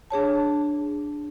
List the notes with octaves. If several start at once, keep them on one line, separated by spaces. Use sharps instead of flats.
D4 G#4 C#5 A5